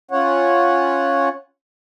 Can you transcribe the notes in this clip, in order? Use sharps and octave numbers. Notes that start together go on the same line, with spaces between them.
C#4 F4 C#5 F#5